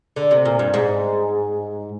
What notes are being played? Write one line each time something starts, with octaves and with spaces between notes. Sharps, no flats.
D3
C3
A#2
G2
G#2